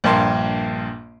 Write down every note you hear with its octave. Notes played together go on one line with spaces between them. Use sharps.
A#1 G2 A#3 C6